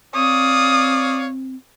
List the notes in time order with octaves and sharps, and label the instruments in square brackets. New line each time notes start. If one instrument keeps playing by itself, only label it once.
[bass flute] C4 [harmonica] C#5 D5 F5 [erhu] D#6